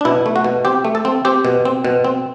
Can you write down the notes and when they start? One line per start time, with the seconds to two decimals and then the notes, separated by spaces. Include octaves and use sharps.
0.01 D4
0.05 B2 E4
0.26 A3
0.36 F#4
0.45 B2
0.65 C4 G4
0.85 A3
0.95 A4
1.05 C4
1.25 C4 G4
1.45 B2
1.65 C4
1.85 B2
2.04 C4